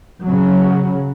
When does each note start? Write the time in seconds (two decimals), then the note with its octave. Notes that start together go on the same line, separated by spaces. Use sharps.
0.23 C#3 F#3